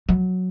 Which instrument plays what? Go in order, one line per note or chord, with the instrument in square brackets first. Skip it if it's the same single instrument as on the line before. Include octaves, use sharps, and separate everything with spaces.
[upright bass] F#3